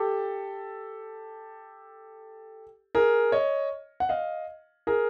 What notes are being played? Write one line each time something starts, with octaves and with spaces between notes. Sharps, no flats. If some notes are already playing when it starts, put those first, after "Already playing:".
Already playing: G4 A4
G#4 A#4
C#5 D#5
F#5
D#5 F5
G#4 A#4